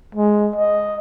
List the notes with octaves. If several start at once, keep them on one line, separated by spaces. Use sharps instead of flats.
G#3
D#5